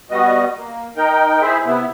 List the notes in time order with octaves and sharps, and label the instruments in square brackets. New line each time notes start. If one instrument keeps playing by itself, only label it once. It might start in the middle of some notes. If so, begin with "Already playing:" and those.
[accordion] G3 B3 F#4 D#5
A#3
D#4 A#4 G5
E4 G#4 C5 E5
C3 B3 E4